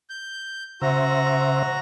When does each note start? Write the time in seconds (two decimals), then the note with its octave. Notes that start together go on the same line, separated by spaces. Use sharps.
0.10 G6
0.82 C#3 F#4 C5 E5 A#5